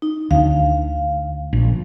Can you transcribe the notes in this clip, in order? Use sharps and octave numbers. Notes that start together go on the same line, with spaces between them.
D#4
D2 F5
A#1